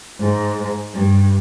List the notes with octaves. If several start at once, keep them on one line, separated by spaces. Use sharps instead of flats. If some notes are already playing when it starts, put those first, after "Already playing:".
G#2
G2